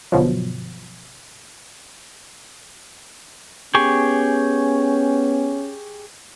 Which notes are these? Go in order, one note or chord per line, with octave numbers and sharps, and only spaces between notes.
G1 B2 F3 F#3
B3 C#4 G4 G#4 C#6